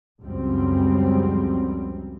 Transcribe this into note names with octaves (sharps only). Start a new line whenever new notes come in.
C#2 F#2 F3 G3 C4